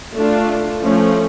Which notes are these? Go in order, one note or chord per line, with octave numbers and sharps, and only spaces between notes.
A3 D4 F4
F3 A3 C#4